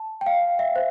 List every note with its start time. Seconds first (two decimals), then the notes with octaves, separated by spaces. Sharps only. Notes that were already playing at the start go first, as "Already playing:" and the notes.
Already playing: A5
0.21 G5
0.26 F5
0.59 E5
0.76 C5